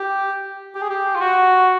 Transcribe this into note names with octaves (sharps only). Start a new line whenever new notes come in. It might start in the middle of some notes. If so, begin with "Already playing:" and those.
Already playing: G4
G4
G#4
G4
F4
F#4